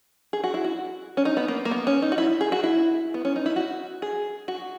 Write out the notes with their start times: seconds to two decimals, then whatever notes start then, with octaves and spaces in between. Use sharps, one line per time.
0.33 G#4
0.44 F#4
0.54 E4
0.65 F#4
1.17 C#4
1.25 D#4
1.37 B3
1.48 A#3
1.65 A#3
1.71 B3
1.87 C#4
2.02 D#4
2.12 F#4
2.18 E4
2.41 G#4
2.52 F#4
2.64 E4
3.14 B3
3.25 C#4
3.36 D#4
3.46 E4
3.56 F#4
4.02 G#4
4.48 F#4